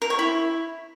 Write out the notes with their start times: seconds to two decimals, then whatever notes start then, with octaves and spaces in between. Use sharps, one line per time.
0.02 A#4
0.10 C#5
0.19 E4